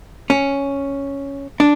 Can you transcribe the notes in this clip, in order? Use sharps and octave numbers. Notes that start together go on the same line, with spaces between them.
C#4
D4